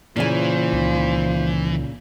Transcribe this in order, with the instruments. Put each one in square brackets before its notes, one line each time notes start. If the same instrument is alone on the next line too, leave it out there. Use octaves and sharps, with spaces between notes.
[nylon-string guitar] A#2 C#3 G#5 [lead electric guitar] E3 [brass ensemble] F4 C5
[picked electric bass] C#2 D#3